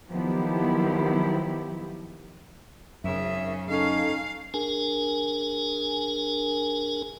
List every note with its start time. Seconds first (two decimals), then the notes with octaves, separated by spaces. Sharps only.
0.11 D#3 F3 F#3 B3 E4 G4
3.04 G#1 F#2 C#3 E5
3.69 C#4 D#4 A4 F5
4.54 D4 G#4 A#4 G#5